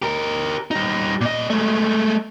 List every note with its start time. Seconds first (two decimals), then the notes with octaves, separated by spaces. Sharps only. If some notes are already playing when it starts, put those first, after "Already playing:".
0.02 G4 A#4
0.71 G3 D#4
1.21 A#2 D#5
1.50 G#3 A3